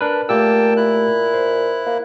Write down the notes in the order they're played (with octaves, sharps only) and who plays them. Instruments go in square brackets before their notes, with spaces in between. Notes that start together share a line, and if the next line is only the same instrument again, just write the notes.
[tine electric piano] D4 A#4 B4
[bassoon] A#2 [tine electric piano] A3 G4 E6 [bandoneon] A#3 G5 A5
[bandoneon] E4 F#6
[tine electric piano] C5
[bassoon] A#3